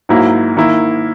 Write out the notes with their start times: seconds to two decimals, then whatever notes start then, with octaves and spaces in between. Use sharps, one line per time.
0.09 G#2 F#3 A#3 E4
0.57 D#3 A#3 E4